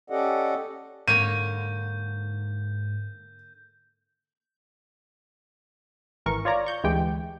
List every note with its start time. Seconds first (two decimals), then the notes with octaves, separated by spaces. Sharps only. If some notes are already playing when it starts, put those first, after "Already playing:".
0.10 C#4 G4 A4 D5 D#5 F#5
1.08 G#2 D3 A#3 C#5 G6 D#7
6.26 G#1 E3 A#4 C#6
6.45 F4 C#5 D5 A#5
6.66 C#6 G6
6.84 D2 E3 G#3 G4 G5